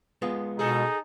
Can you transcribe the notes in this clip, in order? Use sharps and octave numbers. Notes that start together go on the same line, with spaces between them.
G#3 B3 F4
B2 D#4 G#4 A4